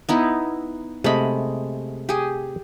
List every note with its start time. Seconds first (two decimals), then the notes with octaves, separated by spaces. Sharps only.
0.09 B3 D#4 E4
1.04 C3 G#3 A3 D#5 B5
2.09 G4 G#4